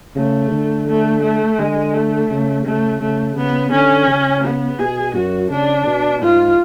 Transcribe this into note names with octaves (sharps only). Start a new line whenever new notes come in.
C#3 A3
D3
A3
A3
D3 G#3
A3
C#3
C#3 A3
C#3 A3
C#3 B3
D3 C#4
C#3
B3
B2 G#4
F#2 F#4
C#3 D4
B2
G#2 F4